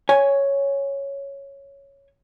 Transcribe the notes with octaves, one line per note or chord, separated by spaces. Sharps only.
C#5 G#5